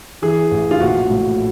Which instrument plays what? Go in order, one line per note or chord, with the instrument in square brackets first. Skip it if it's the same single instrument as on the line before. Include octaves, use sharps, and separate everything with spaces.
[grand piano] E3 G#4
A1
F4
A#1 F#4
A2